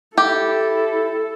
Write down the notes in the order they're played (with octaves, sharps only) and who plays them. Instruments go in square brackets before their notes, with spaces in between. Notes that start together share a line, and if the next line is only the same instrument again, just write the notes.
[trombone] E4 [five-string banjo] G4 [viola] A4